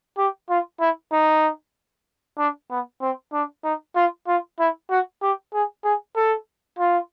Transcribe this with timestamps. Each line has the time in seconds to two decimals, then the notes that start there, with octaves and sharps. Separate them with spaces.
0.18 G4
0.49 F4
0.80 E4
1.12 D#4
2.38 D4
2.70 B3
3.01 C4
3.33 D4
3.64 D#4
3.96 F4
4.27 F4
4.59 E4
4.90 F#4
5.22 G4
5.53 G#4
5.84 G#4
6.16 A4
6.79 F4